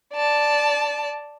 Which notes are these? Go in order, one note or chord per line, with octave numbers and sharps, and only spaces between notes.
D5 A5